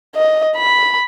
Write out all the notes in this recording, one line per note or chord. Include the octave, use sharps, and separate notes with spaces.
D#5
B5